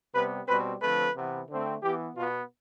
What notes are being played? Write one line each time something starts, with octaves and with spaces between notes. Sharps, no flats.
C3 G3 B3 B4
B2 G3 C4 B4
D3 F3 A3 C4 B4
C3 E3 B3
D3 A3 C4
E3 B3 G4
B2 B3 F4